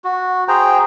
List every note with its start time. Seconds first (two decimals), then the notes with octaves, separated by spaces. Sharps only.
0.04 F#4
0.48 G#4 C5 G5 A#5